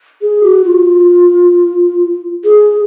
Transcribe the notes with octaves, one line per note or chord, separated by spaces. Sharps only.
G#4
F#4
F4
G#4